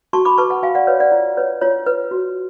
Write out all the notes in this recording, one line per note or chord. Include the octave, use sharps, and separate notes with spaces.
F#4 A5 C#6
B5 D6
B4 A5 C#6
F#5 A5
F#4 F5 G#5
D5 F#5
B4 C#5 F5
D5 F#5
F4
B4 C#5
F4 C#5
B4
F#4